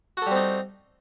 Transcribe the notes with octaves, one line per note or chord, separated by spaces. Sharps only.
G3 C4 D#4 F#4 A4